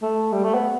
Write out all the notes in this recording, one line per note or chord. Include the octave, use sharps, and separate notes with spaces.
A3
G3
A3
B3